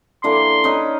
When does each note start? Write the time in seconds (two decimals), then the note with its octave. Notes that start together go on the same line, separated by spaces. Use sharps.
0.24 D3 E3 A#3 C6
0.64 C#4 D#4 B4